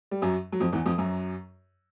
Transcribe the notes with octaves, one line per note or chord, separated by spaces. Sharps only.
G3
F#2 F#3
F#3
F2 F3
E2 E3
F2 F3
F#2 F#3